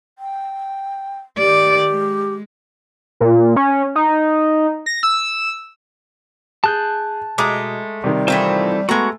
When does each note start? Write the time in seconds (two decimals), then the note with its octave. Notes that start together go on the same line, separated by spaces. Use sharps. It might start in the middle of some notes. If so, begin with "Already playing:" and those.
0.19 G5
1.38 D#3 G4 D5
1.90 G#3
3.20 A#2
3.56 C#4
3.95 D#4
4.86 A#6
5.03 E6
6.64 G#4 A5 F#6 G6
7.38 B2 G#3 A3 A#5 D6 D#6
8.04 C3 D#3 G3
8.28 E3 A3 C4 D#4 F4 C5
8.89 G#3 A3 B3 F#4 A#5 C#6